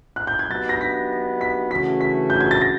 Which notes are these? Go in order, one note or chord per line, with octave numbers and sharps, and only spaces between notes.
F#6
G6
G#6
F#3 B3 D#4 G4 A6
A#6
B6
B6
C#3 E3 A3 C#4 F#4 B6
B6
G6
G#6
A6
A#6